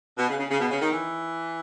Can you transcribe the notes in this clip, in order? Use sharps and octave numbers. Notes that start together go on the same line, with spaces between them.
B2
C#3
C#3
C#3
B2
C#3
D#3
E3